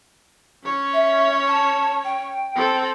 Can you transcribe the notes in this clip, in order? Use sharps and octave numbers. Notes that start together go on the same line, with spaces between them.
C#4 C#5
E5
A5
G5
C4 A4